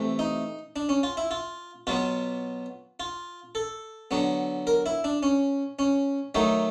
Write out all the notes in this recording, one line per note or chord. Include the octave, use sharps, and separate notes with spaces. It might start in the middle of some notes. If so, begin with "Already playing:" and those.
Already playing: C3 E3 A3
D#4
D4
C#4
F4
E4
F4
B2 F#3 B3 F4
F4
A4
D3 F#3 B3
A#4
E4
D4
C#4
C#4
D#3 F#3 A3 D#4